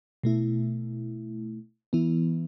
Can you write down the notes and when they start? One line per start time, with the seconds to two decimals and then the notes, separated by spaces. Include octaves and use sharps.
0.23 B2 A3 E4
1.93 E3 B3 E4